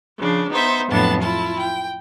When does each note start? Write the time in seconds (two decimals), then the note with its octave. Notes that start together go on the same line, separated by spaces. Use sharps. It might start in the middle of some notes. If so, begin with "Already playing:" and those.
0.18 C#3 F3 D4
0.50 B3 D#4 C5 E5
0.91 F2 A2 F#3 B3 D4 A5
1.21 E4 F4 A5
1.61 G5